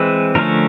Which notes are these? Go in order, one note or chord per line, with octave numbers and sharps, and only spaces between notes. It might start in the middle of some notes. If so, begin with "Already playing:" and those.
Already playing: E3 G#3 C4 B4
D3 F3 A3 C#4 A#4